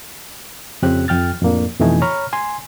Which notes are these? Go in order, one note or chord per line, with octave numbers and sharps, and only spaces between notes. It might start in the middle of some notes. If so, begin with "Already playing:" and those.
F2 C#3 C4 C#4 G4 F#6
F2 G5 F6 A6
F2 A2 A#3 D4
F2 B2 E3 A3 D#4 G#5
C#5 A#5 B5 C#6 F6
G#5 C6